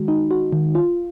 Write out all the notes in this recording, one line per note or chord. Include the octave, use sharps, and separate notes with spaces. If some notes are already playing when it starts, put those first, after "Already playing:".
Already playing: D#3 G#3 F#4
D#4
F#4
D#3
F4